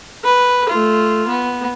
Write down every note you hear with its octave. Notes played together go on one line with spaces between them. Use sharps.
B4
A3 F4
B3